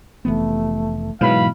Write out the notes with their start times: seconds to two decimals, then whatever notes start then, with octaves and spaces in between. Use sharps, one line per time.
0.25 F1 E3 A3 B3
1.21 G#2 B2 E3 F#3 B3 F5 B5